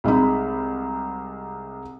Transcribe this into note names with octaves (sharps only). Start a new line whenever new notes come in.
C2 G#3 D#4 B5